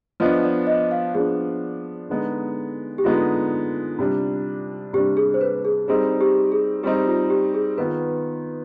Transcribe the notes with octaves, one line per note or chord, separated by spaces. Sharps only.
F3 B3 D4 D#5
D5
D#5
F5
F3 B3 D4 G#4
D3 G#3 B3 D#4
G4
D3 G#3 B3 D#4 F4
C3 G3 D4
C3 G3 D4 G4
G#4
C5
B4
G#4
G3 C4 D#4 G#4
G4
G#4
G3 C4 D#4 G4
F4
G4
G#4
D#3 B3 F4 B4